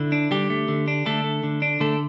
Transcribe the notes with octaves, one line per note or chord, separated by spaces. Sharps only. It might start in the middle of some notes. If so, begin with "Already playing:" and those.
Already playing: D3 E4
D4
D3 G3 G4
A3
D3
D4
D3 A3 A4
A3
D3
D4
D3 A3 A4